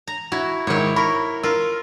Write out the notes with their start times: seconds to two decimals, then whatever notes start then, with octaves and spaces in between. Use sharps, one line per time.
0.08 A#5
0.32 E4 F#4 G#6
0.67 G#2 D#3 E4 C#5
0.96 A#4 B5 C#6
1.43 F4 A#4 E6